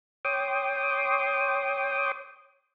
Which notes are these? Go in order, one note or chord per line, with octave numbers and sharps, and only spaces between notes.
C#5 G5 C6 D6 D#6